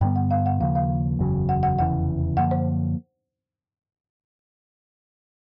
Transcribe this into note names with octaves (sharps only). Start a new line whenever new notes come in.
G2 D3 G3 B3 G5
F#5
F5
F#5
D#2 C#3 F3 A#3 F5
F5
F#1 E2 C#3 F#3
F#5
F#5
F1 E2 C#3 E3 F#5
F#2 D3 F3 A#3 F#5
C5